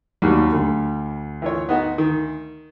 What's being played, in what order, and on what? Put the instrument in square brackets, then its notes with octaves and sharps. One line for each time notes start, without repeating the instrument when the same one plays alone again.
[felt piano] D#2 F#3 [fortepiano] D#3 G3
[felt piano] D2
[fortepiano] E3 F4 C#5
B3 D#4 F#4
D#3